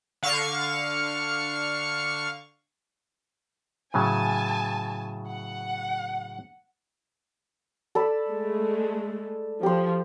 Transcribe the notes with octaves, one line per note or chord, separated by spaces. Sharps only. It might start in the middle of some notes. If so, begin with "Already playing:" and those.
D3 F5 C#6
A2 C#3 F#3 G#5 A5
F#5
A4 D5 B5
G#3 A3
F3 G4 C6